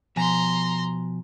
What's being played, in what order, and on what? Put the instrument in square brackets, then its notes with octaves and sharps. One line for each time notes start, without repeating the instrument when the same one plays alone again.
[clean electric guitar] B2 F3 G#5 [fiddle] A#5 C6